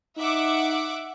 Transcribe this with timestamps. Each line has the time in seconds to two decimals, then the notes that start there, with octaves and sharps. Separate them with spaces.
0.18 D#4 E5 F#5 D6